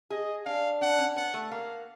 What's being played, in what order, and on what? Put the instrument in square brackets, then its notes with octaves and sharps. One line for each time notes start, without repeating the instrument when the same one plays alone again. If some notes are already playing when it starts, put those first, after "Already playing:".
[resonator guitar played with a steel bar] G#4 [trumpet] D#5
[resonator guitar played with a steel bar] D4 [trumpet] F5
[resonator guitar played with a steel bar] D4 [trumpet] F#5
[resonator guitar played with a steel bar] C#4
[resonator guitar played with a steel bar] B3 [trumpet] F#5
[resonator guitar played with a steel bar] A3
[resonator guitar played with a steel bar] A#3 [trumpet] F5